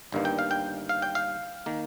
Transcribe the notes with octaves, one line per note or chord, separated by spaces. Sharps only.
G1 G2 D#3 A#3
G5
F5
G5
F5
G5
F5
D#3 A#3